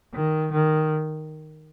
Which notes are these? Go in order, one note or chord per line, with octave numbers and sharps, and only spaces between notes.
D#3
D#3